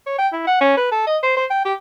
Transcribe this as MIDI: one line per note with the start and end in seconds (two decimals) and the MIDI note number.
0.07 0.14 73
0.18 0.28 79
0.33 0.44 64
0.47 0.59 78
0.61 0.76 61
0.77 0.87 71
0.92 1.07 69
1.07 1.18 75
1.23 1.35 72
1.36 1.45 72
1.51 1.61 79
1.65 1.74 67